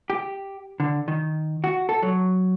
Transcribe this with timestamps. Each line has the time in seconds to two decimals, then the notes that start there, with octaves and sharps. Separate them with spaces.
0.10 G4
0.80 D3
1.08 D#3
1.64 F#4
1.89 A4
2.02 F#3